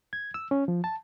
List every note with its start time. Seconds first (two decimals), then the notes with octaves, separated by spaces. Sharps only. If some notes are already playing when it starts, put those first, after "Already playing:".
0.13 G#6
0.34 E6
0.51 C#4
0.68 F3
0.84 A5